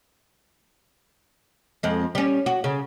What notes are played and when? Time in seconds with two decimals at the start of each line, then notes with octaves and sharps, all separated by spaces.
1.83 F2 G#3
2.15 G3 C#4
2.46 F#4
2.64 C#3